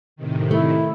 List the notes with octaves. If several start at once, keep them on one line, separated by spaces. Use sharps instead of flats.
A2 C3 D#3
A3 E4